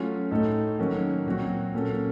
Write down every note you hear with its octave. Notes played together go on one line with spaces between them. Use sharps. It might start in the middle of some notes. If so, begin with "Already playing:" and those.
Already playing: F#3 A3 C#4 F4
A2 A3 D#4 A4 C#5
D#3 F#3 A#3 C#4
A#2 F#3 C4 F#4
A#2 F#3 A#3 C#4 A4